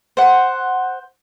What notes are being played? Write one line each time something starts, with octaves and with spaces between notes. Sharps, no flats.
C5 F#5